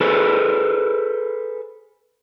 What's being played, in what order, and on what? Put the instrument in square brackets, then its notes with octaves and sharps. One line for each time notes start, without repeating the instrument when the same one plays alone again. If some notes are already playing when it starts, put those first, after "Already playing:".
[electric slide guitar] G#4 A4 B4 C5